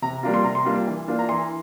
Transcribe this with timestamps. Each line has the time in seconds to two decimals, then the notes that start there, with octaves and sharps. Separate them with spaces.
0.02 C3 A#5
0.23 G3 A#3 D4 F4
0.34 C6
0.44 C3 A#5
0.55 C6
0.65 G3 A#3 D4 F4
0.87 E3
1.08 A#3 D4 F4
1.19 A#5
1.29 E3 C6